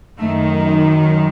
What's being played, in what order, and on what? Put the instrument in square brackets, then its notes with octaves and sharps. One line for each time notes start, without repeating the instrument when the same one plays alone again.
[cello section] F#2 D#3 A3